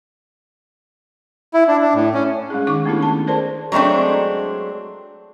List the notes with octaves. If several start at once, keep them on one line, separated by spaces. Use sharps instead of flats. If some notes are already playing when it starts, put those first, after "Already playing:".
E4
D4
D4
A2
C#4
G#3 C#4 G#4
D#3 D#4 C#6 D6
A3 B3 D4 E4 G4 A4
C#4 A5
G#4 A#4 C5 D5 A5 C6
F#3 G#3 A3 C4 D4